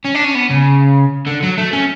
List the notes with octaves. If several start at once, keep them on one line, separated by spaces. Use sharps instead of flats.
C#4
D4
C#4
B3
C#3
D3
F#3
A3
C#4